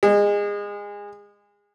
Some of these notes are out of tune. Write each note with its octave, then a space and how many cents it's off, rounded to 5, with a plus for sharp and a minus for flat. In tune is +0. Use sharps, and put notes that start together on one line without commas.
G#3 -25